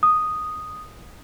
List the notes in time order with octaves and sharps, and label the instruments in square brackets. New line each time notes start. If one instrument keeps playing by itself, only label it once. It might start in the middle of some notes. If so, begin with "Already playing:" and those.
[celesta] D#6